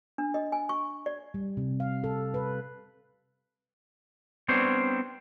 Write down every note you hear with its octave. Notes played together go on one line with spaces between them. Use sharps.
D4
D#5
G#5
C#6
D5
G3
C3
F5
A4
B4
G3 B3 C4 D4 C5 C#5